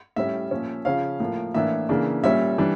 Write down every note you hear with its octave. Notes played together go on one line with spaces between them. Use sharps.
A2 G3 C#4 E5
A#2 F3 C#4
C#3 F3 C#4 F5
A2 F3 A#3
A2 E3 A#3 D4 E5
C#3 E3 A#3 D4
A#2 G3 C#4 E5
E3 G3 D4